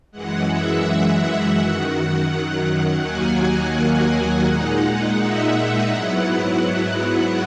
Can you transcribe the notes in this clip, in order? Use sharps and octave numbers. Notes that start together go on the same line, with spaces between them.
F#2 E3 G#3 F#5
E5
F#5
F#2 D#3 F#3
D#2 D#3 F#3 A#3 G#5
F#5
F#5
A#2 G#3 D#4
E5
G#2 F#3 B3 E4 F#5